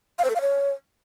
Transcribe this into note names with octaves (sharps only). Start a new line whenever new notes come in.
F5
C5
A4
F5
C#5